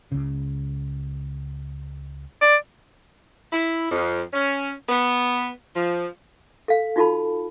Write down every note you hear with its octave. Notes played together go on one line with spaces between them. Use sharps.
C#2 C#3
D5
E4
F2
C#4
B3
F3
A4 F5
D#4 F4 F#4 A4 A5 B5